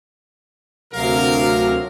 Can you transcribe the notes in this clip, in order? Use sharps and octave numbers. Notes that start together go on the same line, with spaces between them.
D2 C3 F#3 A#4 F5